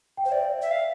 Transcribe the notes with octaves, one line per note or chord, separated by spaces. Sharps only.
G5
C5 F5
D5 E5
D5 E5
F5